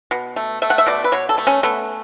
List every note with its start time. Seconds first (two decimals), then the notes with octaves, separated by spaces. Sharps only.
0.11 B2
0.36 A3
0.62 A3 E5
0.70 F#5
0.78 E5
0.87 B2 D5
1.04 B4
1.12 B2 C#5
1.29 A4
1.38 A3
1.47 C#4
1.63 A3 B3